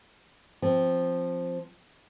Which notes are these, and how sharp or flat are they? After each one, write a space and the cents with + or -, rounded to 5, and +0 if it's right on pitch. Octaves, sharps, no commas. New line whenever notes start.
F3 +0 C4 +0